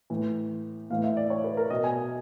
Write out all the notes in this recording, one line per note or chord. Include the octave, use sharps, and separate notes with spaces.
A2 E3
A2 E3 F5
E5
D5
C#5
B4
A#4
B2 D#5
G#5
D#5